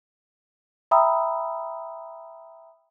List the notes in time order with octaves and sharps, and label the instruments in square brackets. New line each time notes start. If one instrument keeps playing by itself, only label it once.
[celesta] E5 G5 A#5 B5 D#6 E6